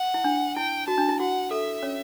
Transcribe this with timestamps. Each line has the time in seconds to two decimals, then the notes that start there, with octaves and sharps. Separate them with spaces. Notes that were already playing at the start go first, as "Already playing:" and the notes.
Already playing: F#5
0.14 E4
0.24 D4
0.56 E4 G5
0.87 F#4 A5
0.98 D4
1.09 E4
1.20 F#4 F#5
1.51 A4 E5
1.82 C#4 C#5